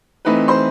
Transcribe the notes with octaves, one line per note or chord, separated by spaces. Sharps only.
E3 A3 C4 D#4 B4 B5
C5 C6